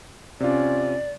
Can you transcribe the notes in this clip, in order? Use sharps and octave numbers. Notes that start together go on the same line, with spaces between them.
C3 C#4 F4 D5